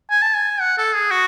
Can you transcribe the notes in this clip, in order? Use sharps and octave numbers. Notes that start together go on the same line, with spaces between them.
G#5
A5
G#5
F#5
A4
G#4
F#4